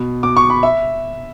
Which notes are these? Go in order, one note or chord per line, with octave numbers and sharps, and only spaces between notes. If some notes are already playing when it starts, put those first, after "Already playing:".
Already playing: B2
B2 D6
C#6
B5
E5